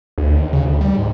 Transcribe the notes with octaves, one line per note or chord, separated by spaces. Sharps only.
D2
D#2
C#3
D2
G3
G#2